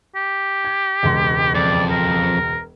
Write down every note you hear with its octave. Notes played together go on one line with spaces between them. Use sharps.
G4
G#6
E1 C#2 C6
F2 D5
A#4